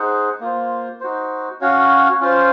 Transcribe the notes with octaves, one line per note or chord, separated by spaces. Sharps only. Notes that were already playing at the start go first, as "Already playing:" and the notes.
Already playing: D#4 G#4 C5 F#5
A#3 F4 C5
D#4 F#4 C5
C#4 F#4 C#5 F5
C#4 F4 C5